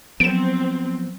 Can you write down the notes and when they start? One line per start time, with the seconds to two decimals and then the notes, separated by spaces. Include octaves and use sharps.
0.20 F3 F#3 B3 C4 D7 E7